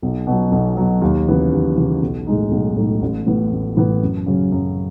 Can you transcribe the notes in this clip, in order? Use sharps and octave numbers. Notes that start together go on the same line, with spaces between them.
B1
B2 F#3
B1
B2 F#3
D#2
C#3 E3 B3
D#2
C#3 E3 B3
B1
A2 G#3 D#4
B1
A2 G#3 D#4
A1
A2 E3 B3
A1
A2 E3 B3
F#2
C#3 F#3 C#4
F#2